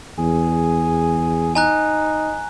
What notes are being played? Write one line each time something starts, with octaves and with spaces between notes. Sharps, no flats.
E2 G#4
D#4 G#5 A#5 F#6